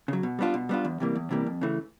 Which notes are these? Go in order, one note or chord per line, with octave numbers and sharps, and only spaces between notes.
C#3 F#3
B2
G3 B3 D4 F4
B2
G3 B3 D4 F4
E2
C3 E3 G3 A#3
E2
C3 E3 G3 A#3
F2
C#3 E3 A3